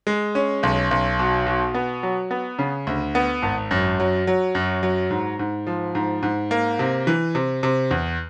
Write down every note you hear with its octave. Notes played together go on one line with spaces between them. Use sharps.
G#3
C#4
B1
B1
B2
B2
B3
F#3
B3
C#3
D2
B3
G#1
F#2
F#3
F#3
F#2
F#3
G#2
G#2
F3
G#2
G#2
A#3
C3
E3
C3
C3
E2